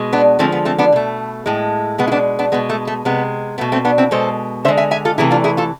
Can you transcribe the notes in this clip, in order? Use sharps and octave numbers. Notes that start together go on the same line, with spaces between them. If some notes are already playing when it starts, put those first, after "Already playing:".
Already playing: B2 G#3
B3 D4
D3 F3 G#3 A3 C4
B3
A3 C4
B3 D4
B2 A3
A2 G#3
B2 G#3 B3
E4
B3 D4
B3 D4
B2 G#3 B3
A3
A3
C3 G#3 B3
B2 A3 B3
A3 C4
B3 D4
C4 E4
B2 G#3 A4 C5
D3 G#3 C5 E5
E5 G#5
E5 G#5
F4 A4
C3 E3 A3 E4 G#4
D4 F4
E4 G#4
F4 A4